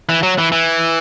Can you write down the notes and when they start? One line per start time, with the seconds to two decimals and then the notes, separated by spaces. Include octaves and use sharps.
0.09 E3
0.23 F#3
0.38 E3
0.52 E3